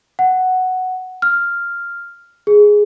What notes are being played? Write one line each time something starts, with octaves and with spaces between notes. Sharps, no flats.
F#5
F6
G#4